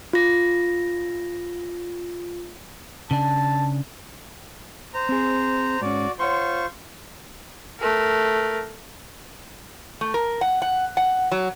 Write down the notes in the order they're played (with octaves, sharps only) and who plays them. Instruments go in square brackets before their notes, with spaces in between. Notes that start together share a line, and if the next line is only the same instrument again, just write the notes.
[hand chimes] F4 A#6
[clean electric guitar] C#3 D4 [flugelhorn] A5
[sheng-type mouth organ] C5 A#5
[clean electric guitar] C4 G#4
[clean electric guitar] G#2 C#4 [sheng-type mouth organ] F#4 D5
[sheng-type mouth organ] F4 C5 C#6 [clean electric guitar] C#5 F#5 C6
[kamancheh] A3 A#4
[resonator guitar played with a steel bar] A3
A#4
F#5
F#5
F#5
F#3